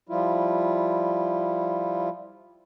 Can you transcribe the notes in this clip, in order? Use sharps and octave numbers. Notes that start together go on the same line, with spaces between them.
F3 G3 E4 F4